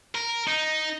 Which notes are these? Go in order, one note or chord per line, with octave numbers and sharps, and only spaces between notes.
A#4
D#4